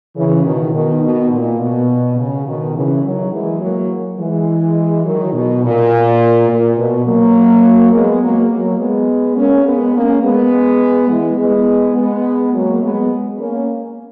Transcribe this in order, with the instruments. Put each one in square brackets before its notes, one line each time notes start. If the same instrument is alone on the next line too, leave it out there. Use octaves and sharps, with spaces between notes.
[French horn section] C#3 E3
B2 D#3
B2 D#3
B2
A#2
B2
C#3
B2 D#3
C#3 E3
D#3 F#3
E3 G#3
F#3 A#3
E3 G#3
D#3 F#3
B2
A#2
A#2
B2
F#3 A#3
G#3 B3
F#3 A#3
F#3 A#3
G#3 B3
A#3 C#4
G#3 B3
A#3 C#4
G#3 B3
E3 G#3
G#3 B3
G#3 B3
F#3 A#3
G#3 B3
A#3 C#4